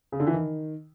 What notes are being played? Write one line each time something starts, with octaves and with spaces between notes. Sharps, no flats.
C#3
D3
E3
D#3